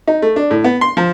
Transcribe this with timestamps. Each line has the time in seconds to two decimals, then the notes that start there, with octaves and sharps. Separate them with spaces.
0.08 D#4
0.22 A3
0.36 D4
0.51 A2
0.64 B3
0.81 C6
0.97 F3